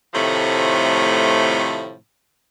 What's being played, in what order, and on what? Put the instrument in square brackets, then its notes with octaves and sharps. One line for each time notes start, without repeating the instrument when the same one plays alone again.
[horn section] A2 C3 D#3 F3 A3